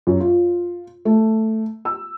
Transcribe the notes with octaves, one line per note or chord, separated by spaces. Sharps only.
F#2
F4
A3
E6